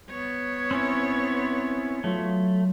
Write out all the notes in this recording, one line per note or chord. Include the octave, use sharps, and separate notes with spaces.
B3 C#5
C4 C#4 E4
F#3 A3 F4